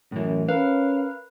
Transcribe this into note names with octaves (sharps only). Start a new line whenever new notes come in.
F#2 A2 E3
C#4 A#4 B4 F5